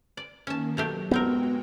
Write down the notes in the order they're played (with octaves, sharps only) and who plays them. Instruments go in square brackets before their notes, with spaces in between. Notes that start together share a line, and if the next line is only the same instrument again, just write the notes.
[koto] D5
[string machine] D#3 A#3 [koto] C#4 A5
[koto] B2 A3 G4 [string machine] F#3
[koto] A2 C4 A#4 [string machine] G#3 F#4 G5 [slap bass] B3